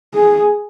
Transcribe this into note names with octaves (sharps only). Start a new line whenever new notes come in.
G#4